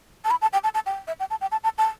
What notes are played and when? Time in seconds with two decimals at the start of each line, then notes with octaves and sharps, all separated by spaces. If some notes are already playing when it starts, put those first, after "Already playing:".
0.24 A5
0.31 B5
0.42 A5
0.53 G5
0.64 A5
0.74 A5
0.86 G5
1.08 E5
1.20 G5
1.30 A5
1.41 G5
1.52 A5
1.64 A5
1.78 A5